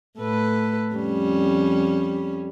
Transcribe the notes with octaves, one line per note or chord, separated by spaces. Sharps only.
A2 A4 B4
F2 G3 C#4